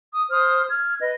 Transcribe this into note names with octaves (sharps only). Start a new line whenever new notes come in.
D#6
C5 D#6 F6
F6 G#6
B4 D#5